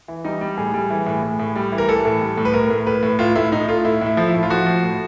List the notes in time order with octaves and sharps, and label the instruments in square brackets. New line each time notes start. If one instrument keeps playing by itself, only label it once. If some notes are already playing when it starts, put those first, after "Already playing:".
[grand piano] E3
G3 D#4
G3
A2 G#4
G3
E3
A2
A2
A2
G3
E3
A#4
E3 A4
A2
G3
A2
B4
A2 A#4
A2
A2 B4
A2
A2 F4
A2 E4
A2 D#4
A3 F4
A2 E4
A2 E4
F3
E4
A2
F4
F3 F#4
F3
A2